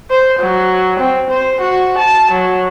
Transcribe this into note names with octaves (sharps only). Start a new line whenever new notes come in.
C5
F#3
C4
C5
F#4
A5
F#3